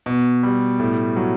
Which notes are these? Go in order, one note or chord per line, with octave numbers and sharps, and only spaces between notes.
B2
G3
A2
F#3